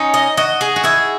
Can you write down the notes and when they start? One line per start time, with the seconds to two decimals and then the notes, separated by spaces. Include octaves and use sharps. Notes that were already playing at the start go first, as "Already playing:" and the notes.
Already playing: C#4 D#4
0.14 D#5
0.37 F#4 D#5
0.61 G#4
0.76 F#4
0.84 E4 G#4